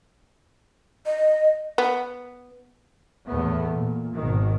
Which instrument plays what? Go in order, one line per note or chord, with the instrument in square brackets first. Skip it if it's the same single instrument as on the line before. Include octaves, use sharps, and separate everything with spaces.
[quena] D#5
[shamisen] B3
[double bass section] E2 A2 A3 B3
A#2
G#1 B2 D#3